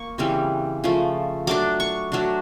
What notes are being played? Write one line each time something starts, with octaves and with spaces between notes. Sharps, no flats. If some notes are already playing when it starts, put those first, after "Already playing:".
Already playing: A#3 C#6
C#3 E3 G3 C4
C#3 F3 A3
F#3 A3 D4 D6
C#6
F#3 A3 D4